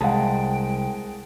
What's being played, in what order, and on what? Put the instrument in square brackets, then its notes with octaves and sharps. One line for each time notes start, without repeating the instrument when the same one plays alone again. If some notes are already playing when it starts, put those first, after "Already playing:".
[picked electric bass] C2 [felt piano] G#3 [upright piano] F#5 A5 [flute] G5